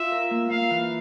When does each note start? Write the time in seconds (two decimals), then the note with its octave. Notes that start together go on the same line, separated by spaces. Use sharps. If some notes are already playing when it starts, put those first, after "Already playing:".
Already playing: F4 E5
0.12 A#4
0.31 A#3
0.50 A#3 F5
0.70 E3